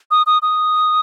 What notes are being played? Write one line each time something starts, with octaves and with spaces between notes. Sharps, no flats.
D#6
D#6
D#6